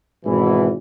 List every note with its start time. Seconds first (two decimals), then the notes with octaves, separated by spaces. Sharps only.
0.25 G#1 B2 E3